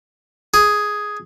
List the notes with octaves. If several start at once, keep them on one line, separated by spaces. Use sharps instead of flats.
G#4